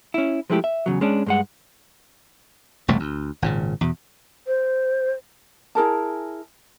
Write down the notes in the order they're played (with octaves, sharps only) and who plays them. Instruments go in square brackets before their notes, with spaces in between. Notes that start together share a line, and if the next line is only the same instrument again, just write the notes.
[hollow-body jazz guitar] C#4 E4
F3 G#3 A3 E4 G4
E5
E2 C#3 F#3
G#3 C#4 D4
G2 G#3 F#5
[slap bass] E1 C2 F#2 A3
D2
G#1 A#2 C#3
E2 B2
[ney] C5
[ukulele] E4 G#4 A#4 A5